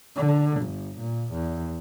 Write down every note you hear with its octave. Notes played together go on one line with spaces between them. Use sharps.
D3
G1
A#2
E2